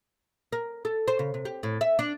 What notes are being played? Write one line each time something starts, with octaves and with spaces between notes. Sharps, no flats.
A#4
A4
C5
C#3
C3
G4
A2
E5
D4